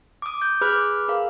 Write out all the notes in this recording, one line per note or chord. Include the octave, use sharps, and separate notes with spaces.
D6 D#6
G6
G#4 B4 B5 D6 F6 F#6
G#4 A#4 F5